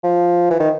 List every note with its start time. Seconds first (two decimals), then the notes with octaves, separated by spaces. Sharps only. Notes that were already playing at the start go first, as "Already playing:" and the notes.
0.03 F3
0.50 E3
0.60 D#3